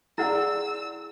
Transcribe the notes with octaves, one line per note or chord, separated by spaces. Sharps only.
E4 G#4 D5 F#5 E6